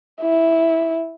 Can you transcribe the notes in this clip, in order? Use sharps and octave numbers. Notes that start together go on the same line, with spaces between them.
E4